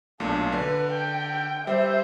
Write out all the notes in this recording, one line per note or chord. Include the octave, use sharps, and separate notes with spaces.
B1 A#2 A3 D4
D3 B4
G5
G3 C5 E5